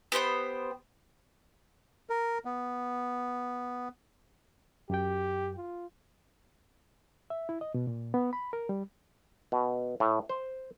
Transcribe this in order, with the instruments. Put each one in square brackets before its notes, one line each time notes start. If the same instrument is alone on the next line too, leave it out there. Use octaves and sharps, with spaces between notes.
[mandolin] B3 G4 C5 G5
[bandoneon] A#4
B3
[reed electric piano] F#2 G5 [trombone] G4
[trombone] F4
[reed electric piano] E5
E4
D#5
B2
A#2
B3
B5
A#4
G3
[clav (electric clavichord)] B2
A2
C5